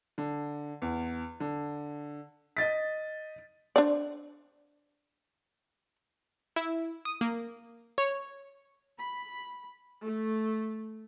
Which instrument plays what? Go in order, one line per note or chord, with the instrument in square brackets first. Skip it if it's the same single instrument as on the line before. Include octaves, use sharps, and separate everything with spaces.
[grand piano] D3
E2
D3
[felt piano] D#5 A6 B6
[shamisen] D4 C5 D5
[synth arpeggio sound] E4
D#6
A#3
C#5
[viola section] B5
A3